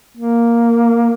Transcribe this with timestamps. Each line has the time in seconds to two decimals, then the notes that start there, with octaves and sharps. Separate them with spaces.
0.17 A#3